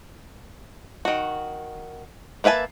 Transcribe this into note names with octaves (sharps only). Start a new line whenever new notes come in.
D#3 F#4
A#3 B4 E5 G#5 A5